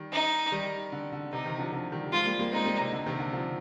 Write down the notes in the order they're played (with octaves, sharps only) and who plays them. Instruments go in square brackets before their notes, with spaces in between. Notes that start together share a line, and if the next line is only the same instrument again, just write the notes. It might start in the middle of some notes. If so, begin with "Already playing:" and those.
Already playing: [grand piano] D#3 G3
[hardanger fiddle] D#4
[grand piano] D#3 G3
D3
D3
[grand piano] C3 [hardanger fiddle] D#4
[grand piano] C3 D#3
D3 F3
D3 F3
D#3 G3
G3
[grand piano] F3 G#3 [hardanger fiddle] F4
[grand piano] G3 A#3
G3 A#3
[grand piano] G#3 C4 [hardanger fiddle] D#4
[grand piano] G3 A#3
C3
D3
C3 D#3
D3
D3 F3